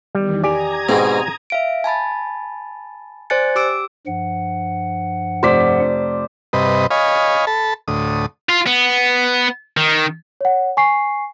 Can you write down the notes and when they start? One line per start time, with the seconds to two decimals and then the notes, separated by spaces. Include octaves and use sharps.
0.15 E2 D#3 G3
0.44 G4 D5 G#5 A#5 D#6 G#6
0.89 G#2 B2 C4 G#4
1.50 E5 F5 D7
1.84 G#5 A5 B5 A6
3.30 C5 D5 G#5 F#6 A6 C#7
3.55 G4 D6 E6 D7
4.07 G2 F3 F#5
5.43 F1 C5 D5 B6
6.53 G2 C3 B4 D#5
6.91 C#5 D#5 F5 G#5 B5
7.47 A4 A5 B5
7.88 D2 A2 D#6
8.49 F4
8.67 B3
9.77 D#3
10.41 C#5 F#5
10.77 G#5 C#6 C7